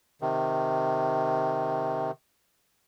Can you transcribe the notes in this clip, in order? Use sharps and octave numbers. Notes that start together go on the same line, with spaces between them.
C3 D#3